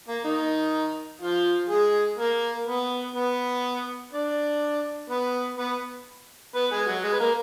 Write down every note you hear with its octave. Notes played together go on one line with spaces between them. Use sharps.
A#3
D#3 D#4
F3 F4
G#3 G#4
A#3 A#4
B3 B4
B3 B4
D4 D5
B3 B4
B3 B4
B3 B4
G#3 G#4
F#3 F#4
G#3 G#4
B4
A#3 A#4